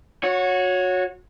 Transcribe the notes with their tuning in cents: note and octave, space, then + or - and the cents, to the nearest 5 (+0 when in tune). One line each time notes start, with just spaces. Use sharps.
F#4 -25 C#5 +0